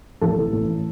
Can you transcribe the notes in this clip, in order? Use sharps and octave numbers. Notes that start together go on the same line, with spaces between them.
A1 A4
E3
A2